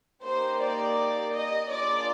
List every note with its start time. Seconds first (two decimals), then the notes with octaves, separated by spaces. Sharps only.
0.23 A#3 D#4 G4 C5
0.60 D5
1.32 D#5
1.69 A#3 D4 F4 G#4 D5